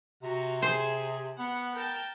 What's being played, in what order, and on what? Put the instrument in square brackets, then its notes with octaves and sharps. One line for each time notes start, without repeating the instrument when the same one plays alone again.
[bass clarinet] C3 [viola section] F#4 A#5
[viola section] G#4 [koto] C5
[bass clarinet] B3 [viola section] F#5
[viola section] A#4 G5 A5